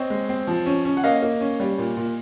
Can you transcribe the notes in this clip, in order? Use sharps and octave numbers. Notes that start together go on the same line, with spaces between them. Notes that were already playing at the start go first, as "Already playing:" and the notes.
Already playing: C4 C#5 D#5
G#3
C4
F3
C#4
C#4
F#5
A#3 D#5 F5
A#3
C#4
G3
A#2
A#2